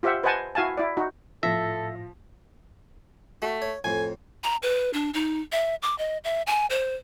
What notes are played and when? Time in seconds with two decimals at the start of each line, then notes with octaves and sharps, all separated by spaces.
0.03 F4 G4 C5 E5 F#5
0.23 B4 C5 D#5 F#5 G#5 A5
0.55 E4 F#4 F5 G#5 A5
0.77 E4 D5
0.97 D#4 F#4
1.43 A2 F3 A4 E5 A#6
3.42 A3 F#4
3.62 C#5
3.84 F2 A2 G#5
4.44 A#5
4.63 B4
4.93 D4
5.14 D#4
5.52 E5
5.82 D6
5.98 D#5
6.24 E5
6.47 G#5
6.70 C5